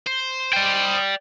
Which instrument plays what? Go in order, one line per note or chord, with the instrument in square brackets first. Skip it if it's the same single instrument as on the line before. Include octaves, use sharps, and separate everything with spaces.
[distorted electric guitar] C5
[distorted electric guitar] C5 D#5 [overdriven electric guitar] D5 G5